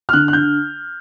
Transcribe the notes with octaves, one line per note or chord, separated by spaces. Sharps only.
F6
D3 F#6
F#6
D3 G6